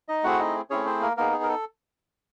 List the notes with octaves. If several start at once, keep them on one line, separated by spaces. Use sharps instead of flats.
D#4 D#5
A3 C4 E4 F#4 G#4 F#5
D#4 D#5
A3 C4 C#4 E4 G#4 C#5
C4 C5
A#3 A#4
A#3 B3 D#4 G#4 A#4
G#4
A#4
A4